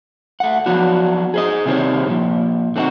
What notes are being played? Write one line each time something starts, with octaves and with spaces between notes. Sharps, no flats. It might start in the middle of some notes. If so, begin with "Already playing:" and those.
A3 F#5
F3 F#3 B3 D4 F#4
G#4 C5 D#5
C3 D#3 G3 G#4 C5 C#5
A#2 F3
D3 C4 D4 D#4 F#4